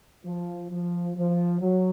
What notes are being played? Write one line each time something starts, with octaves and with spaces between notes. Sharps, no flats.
F3
F3
F3
F#3